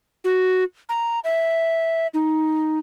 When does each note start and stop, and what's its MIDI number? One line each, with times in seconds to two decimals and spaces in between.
0.24 0.64 66
0.89 1.20 82
1.24 2.07 76
2.14 2.79 63